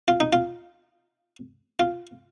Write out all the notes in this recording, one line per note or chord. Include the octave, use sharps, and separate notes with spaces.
F4
D#4
F4
F4